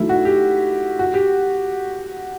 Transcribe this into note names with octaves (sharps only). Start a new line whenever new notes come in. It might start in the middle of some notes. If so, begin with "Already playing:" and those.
Already playing: D#3 F#3 A3 E4
F#4
G4
F#4
G4